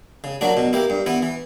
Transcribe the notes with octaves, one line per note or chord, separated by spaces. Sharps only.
C#3
F#3 A#3 D4 F#4
B2
A#3 E4 G4
G2
E3 B3 E4
E3